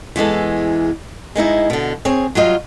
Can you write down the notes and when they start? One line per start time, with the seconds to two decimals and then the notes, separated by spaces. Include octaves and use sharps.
0.16 E2 E3 G#3 A4
1.36 G#3 B3 D#4 E4
1.70 B2 D3
2.05 C4 G#4 C#5
2.35 F#3 G3 F4 D#5